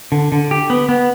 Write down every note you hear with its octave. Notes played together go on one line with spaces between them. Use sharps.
D3
D3
G4
B3
B3